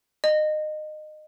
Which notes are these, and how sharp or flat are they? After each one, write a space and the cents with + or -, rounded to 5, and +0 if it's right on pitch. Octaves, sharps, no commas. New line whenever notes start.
D#5 -25